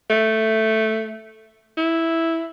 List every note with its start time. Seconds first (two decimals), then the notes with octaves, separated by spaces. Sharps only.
0.10 A3
1.77 E4